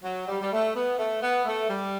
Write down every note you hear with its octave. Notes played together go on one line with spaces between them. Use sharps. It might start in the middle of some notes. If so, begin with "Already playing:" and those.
F#3
G3
G3
A3
B3
A3
B3
A3
G3